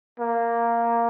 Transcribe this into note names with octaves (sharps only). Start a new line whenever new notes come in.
A#3